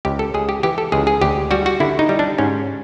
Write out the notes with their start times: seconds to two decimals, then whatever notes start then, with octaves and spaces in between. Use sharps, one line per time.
0.05 C#2 G4
0.19 A4
0.34 C#2 G#4
0.49 G4
0.63 E3 G4
0.78 A4
0.92 C#2 G#4
1.07 G#4
1.21 D2 G4
1.51 G3 F#4
1.66 F#4
1.80 D3 E4
1.99 D#4
2.09 G3
2.19 D4
2.38 G#2 C#4